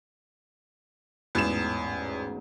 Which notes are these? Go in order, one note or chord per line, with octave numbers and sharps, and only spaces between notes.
A1 E2 G#2 B2 E7